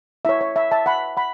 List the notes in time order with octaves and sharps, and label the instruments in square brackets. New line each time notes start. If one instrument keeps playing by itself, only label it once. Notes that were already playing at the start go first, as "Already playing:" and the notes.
[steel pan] E4 C#5 E5
C#5
E5
E5 A5
F#5 B5
F#5 B5